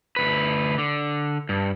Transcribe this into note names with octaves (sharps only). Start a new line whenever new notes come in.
D2 B4
D3
G2